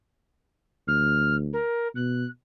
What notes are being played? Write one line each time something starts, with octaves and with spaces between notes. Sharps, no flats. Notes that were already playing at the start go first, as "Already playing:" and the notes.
D2 F6
A#4
B2 F#6